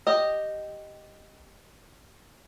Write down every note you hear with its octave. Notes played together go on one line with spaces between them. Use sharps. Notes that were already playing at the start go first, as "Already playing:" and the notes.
G4 D#5